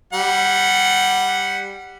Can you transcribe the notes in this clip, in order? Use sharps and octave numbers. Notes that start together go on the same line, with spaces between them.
G3 F#5